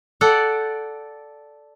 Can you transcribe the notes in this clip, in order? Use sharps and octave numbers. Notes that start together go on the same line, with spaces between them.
A4 D5 F#5 G5